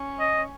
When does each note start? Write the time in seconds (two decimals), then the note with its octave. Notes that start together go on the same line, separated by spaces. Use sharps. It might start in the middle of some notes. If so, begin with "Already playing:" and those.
Already playing: C#4
0.20 D#5